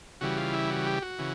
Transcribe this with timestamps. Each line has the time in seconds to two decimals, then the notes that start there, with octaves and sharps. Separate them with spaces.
0.21 C#3 E3 G3 F#4
0.38 F4
0.53 E4
0.70 F#4
0.86 G4
1.02 F#4
1.19 C#3 E3